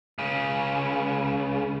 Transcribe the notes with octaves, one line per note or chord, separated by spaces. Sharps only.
C#2 C#3